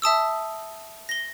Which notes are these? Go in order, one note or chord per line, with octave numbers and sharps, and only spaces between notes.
E5 A5 D#6 E6
A#6 G7